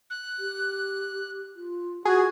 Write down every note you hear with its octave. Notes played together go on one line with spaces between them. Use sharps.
F#6
G4
F4
F4 F#4 G#4 G#6